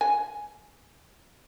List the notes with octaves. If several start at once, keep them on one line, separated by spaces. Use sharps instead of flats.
G#5